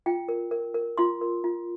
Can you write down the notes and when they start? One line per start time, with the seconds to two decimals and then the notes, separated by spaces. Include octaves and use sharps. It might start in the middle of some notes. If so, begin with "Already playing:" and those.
0.06 F4 G5
0.29 A#4
0.51 A#4
0.74 A#4
0.98 F4 C6
1.21 A#4
1.44 F4